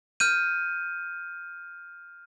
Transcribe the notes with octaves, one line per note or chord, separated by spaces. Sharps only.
F6 G6 D#7